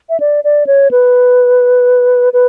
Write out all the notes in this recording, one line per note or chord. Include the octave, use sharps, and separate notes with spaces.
E5
D5
D5
C#5
B4
B4